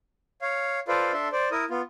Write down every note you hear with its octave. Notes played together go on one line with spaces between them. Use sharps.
C#5 F5
F4 A4 B4 C5 D5 F5
D4 A4 E5 C6
C5 D5
E4 A#4 D#6
B3 F4